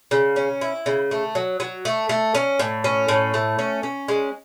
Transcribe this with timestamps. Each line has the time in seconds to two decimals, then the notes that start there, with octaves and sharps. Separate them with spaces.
0.11 C#3
0.36 C#4
0.61 E4
0.86 C#3
1.11 A3
1.35 F#3
1.60 F#3
1.85 A3
2.09 A3
2.35 C#4
2.59 A2
2.84 C#4
3.08 A2
3.34 A3
3.59 C#4
3.83 C#4
4.08 G#3